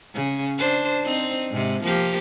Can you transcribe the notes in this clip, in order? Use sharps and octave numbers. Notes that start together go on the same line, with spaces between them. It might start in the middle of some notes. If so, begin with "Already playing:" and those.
C#3
D4 C5
C4 D#4
G#2 C3
F3 A#3 G4